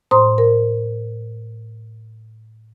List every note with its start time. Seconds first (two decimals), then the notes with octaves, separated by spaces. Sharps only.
0.11 A2 C5 A#5 C6 D#6
0.38 A#4